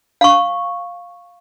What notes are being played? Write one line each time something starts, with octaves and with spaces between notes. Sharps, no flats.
F5 C#6